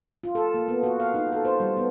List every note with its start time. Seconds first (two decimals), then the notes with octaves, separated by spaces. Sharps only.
0.24 F4
0.35 A4
0.54 A#3
0.68 B3
0.83 F#4
1.00 F5
1.14 D#4
1.32 A4
1.45 C5
1.60 G3
1.77 B3